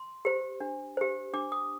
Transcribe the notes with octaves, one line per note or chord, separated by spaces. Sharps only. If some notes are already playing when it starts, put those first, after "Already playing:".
Already playing: C6
G4 C5
D4
G4 C5
D4 D6
D#6